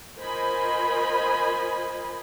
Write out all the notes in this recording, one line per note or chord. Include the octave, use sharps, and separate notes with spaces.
F4 A#4 C5 D#5 G#5 B5